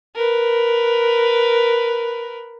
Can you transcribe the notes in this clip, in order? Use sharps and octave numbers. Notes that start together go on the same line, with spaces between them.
A#4 B4